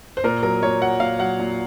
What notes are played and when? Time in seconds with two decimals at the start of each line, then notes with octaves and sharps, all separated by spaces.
0.17 C5
0.24 A#2 A#4
0.43 F#3 A#4
0.63 A#2 C#5
0.81 F#3 F#5
1.00 A#2 F5
1.19 F#3 F#5
1.39 A#2